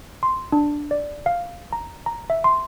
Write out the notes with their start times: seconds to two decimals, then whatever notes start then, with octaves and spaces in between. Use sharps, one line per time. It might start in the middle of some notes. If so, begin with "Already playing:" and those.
0.23 C6
0.52 D4
0.91 D5
1.26 F5
1.73 A#5
2.06 A#5
2.30 E5
2.44 C6